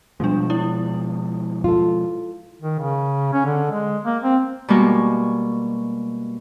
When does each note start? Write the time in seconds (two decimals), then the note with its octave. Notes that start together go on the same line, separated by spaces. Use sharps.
0.20 B2 F3 G3 G#3 D4
0.50 E4
1.64 F4 A4
2.62 D#3
2.80 C#3
3.33 C#4
3.45 D3
3.71 G#3
4.04 A#3
4.23 C4
4.68 B2 G3 G#3 A#3 C#6